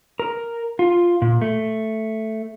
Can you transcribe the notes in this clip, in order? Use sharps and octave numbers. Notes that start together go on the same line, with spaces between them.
A#4
F4
A#2
A3